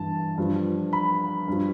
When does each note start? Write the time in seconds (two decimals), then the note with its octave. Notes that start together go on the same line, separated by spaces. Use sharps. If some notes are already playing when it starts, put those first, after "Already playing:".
Already playing: G2 E3 A5
0.38 G2 F3
0.93 B5
1.48 G2 F3